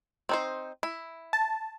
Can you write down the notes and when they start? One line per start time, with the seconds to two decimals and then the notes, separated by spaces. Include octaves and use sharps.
0.29 C4 D#4 C5
0.83 E4
1.33 A5